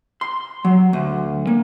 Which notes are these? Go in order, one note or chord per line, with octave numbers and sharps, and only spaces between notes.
C6
F#3
D2
A#3